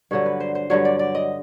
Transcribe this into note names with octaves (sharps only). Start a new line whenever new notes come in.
G2 D3 F#3 C#5
B4
C5
C5
G2 D3 F#3 C#5
D5
D5
D#5